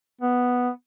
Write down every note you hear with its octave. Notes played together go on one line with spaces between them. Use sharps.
B3